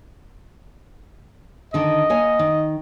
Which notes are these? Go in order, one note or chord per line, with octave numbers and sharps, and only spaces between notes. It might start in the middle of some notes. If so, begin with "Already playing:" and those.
D3 D#3 D#5
A#3 C#5 G#5
D#3